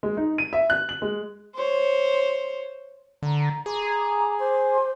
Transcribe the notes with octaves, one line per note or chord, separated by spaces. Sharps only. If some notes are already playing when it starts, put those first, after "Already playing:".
G#3
D#4
D#7
E5
F#6
F#7
G#3
C5 C#5
D3 A#5
G#4 A#5 C6 D6
C5 D6